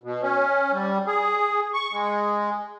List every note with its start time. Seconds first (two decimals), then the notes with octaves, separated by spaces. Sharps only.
0.04 B2
0.22 C#4
0.73 G3
1.07 G#4
1.74 C#6
1.93 G#3